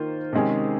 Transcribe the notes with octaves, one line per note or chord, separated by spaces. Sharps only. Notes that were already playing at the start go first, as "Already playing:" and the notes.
Already playing: D#3 A#3 F4 C5
C3 D#3 G#3 C#4 G#4